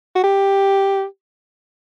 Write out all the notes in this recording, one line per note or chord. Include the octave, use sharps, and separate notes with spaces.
F#4
G4